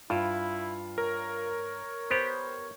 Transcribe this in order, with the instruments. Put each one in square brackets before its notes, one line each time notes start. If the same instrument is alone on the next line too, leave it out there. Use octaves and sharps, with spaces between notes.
[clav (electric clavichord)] G2 [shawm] E4 [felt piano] F4
[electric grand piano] A#4 [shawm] C#5
[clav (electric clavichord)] B3 G4 [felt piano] C5